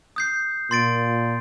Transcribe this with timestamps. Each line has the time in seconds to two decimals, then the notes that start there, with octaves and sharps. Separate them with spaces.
0.16 D#6 G6 C7
0.71 A#2 C6 A6 D7